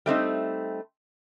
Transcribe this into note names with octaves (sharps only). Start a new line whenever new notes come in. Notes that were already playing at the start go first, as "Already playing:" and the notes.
G3 A3 C4 D#4